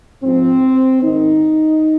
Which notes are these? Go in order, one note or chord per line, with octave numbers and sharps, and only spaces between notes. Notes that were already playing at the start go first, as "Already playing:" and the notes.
G#2 F3 C4
G#2 D#3 D#4